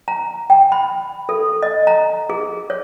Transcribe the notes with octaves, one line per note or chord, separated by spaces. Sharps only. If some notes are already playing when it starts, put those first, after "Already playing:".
A#5
G5
B5
A4
D#5
A#5
G#4
C#5